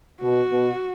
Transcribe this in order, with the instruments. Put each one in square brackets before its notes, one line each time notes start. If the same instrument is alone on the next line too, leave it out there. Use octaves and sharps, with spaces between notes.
[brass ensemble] B2 [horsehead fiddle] F#4
[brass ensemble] B2